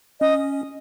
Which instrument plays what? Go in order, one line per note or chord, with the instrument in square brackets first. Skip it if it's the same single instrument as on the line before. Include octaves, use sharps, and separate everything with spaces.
[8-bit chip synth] C#4 [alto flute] D#5